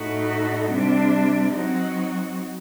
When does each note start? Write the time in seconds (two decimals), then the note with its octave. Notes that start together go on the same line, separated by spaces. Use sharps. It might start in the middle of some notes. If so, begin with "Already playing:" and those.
Already playing: A2 A3 D#4 F#4
0.70 C3 G3 D4
1.52 F#3 C4 D#4 F#4